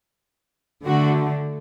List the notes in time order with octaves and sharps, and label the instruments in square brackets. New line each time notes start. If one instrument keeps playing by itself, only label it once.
[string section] D3 A3 F#4